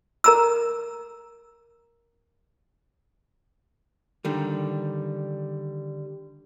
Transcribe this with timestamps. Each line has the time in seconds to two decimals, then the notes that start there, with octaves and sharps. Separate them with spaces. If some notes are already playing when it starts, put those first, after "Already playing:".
0.24 A#4 A#5 E6
4.25 D3 D#3 G3